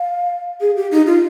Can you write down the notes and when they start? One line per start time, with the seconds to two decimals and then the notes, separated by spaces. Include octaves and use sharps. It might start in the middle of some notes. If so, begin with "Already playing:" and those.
Already playing: F5
0.61 G#4
0.76 G4
0.91 D#4
1.06 F4